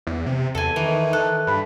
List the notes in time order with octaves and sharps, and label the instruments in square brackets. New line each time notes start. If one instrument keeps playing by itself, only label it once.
[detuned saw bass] E2
C3
[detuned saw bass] E2 [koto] A4 G#5
[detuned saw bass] D#3 [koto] E3
[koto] A4 [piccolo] F#6
[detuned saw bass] G2 [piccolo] B5